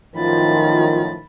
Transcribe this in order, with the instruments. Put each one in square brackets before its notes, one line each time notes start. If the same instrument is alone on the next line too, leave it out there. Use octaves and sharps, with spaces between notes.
[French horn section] F#2 A2 F3 [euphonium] D#3 [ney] F4 [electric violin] B5 A6